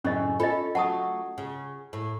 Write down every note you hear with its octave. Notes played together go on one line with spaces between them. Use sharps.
F#2 A2 C#3 C#4 D#5
C#4 F4 A4 D#5
F#3 A3 F#5 A5 D#6
C#3
A2